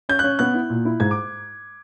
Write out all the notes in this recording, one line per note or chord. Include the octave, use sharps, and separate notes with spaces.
C#4 G6
C#4 F#6
B3 F#6
E4
A#2
E4
G#2 G#6
D6